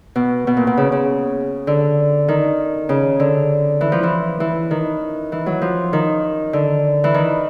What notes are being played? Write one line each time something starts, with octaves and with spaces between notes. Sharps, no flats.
B2
B2
A#2
B2
C#3
C#3
D3
D#3
C#3
D3
E3
F3
E3
E3
D#3
E3
F#3
F3
D#3
D3
E3
D#3